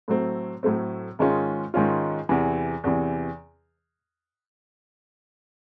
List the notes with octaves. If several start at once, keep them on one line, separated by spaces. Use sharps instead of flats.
A2 F#3 A3 C4
A2 F#3 A3 C4
G#2 D#3 G#3 C#4 F4
G#2 D#3 G#3 C#4 F4
E2 C3 E3
E2 C3 E3